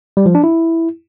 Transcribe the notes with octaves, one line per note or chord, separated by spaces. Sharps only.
G3
F3
D4
E4